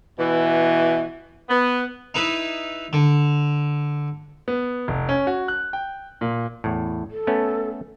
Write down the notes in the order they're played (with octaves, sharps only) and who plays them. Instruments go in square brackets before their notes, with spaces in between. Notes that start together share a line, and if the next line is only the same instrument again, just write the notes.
[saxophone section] B2 E3
B3
[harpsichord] D#4 E4 B4
D3
[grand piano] B3
F1
C#4
F#4
F#6
G5
A#2
[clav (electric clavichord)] E2 A2
[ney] A4
[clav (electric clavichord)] A3 B3 C#4